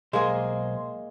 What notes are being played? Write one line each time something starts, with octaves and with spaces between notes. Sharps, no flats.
B1 G#3 A#3 G#4 C5